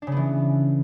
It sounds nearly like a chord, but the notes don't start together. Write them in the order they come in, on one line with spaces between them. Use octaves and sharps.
D4 C#3 B3 E3